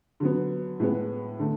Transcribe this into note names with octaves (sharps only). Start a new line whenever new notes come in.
D3 F#3 B3
A2 G#3 B3
D3 A3